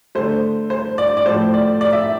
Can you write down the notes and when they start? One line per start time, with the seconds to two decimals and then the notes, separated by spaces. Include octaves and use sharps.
0.15 D3 A3 C5
0.70 C5
0.98 D5
1.17 D5
1.26 A2 F3 A3 C5
1.54 D5
1.81 D5
1.93 E5